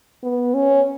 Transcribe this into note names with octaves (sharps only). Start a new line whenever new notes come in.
B3
C#4